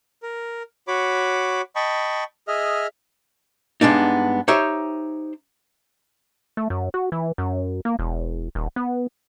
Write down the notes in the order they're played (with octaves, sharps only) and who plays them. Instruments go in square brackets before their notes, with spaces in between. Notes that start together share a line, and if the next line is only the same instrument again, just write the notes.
[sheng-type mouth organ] A#4
F#4 C#5 B5 D6
D#5 G5 A5 B5 C#6
G#4 D#5 E5 F6
[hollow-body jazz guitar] G2 G#3 B3 D4 D#4
D#4 G4 C5 C#5 E5
[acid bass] A3
F#2
F#4
E3
F#2
A#3
E1
D#1
B3